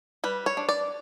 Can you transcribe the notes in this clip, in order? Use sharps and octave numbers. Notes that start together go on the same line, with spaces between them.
G3 B4
C#5
D4
D5